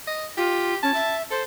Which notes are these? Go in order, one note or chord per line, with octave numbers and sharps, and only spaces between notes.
D#5
F4 G4
C#4 A5
E5
A4 C5